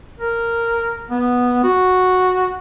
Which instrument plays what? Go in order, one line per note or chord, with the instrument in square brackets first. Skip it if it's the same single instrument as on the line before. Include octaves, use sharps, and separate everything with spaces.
[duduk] A#4
B3
F#4